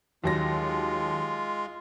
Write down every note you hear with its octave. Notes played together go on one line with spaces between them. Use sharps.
D#2 F#3 G#3 F4 A#6